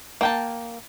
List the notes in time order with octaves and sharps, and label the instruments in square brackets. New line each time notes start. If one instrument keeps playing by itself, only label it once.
[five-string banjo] A#3 G5 A5